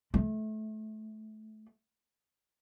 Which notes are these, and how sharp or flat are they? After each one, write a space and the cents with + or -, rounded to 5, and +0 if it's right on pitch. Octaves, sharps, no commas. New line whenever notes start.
A3 -25